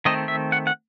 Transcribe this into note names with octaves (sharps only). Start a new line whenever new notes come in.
D#3 A3 C4 D#5
E5
F#5
F#5